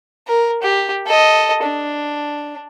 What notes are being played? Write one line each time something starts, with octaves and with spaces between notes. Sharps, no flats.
A#4
G4
A4 D#5
D4